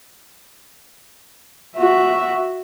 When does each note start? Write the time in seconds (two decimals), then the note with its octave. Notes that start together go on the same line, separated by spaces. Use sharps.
1.77 F#4 E5